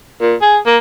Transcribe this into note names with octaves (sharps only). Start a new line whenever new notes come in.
A#2
G#4
A#3